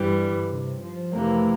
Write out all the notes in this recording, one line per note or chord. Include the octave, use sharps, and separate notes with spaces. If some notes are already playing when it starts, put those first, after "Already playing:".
Already playing: G2 E3 G3
D3
C3
F3
F2 C3 E3 A3 A#3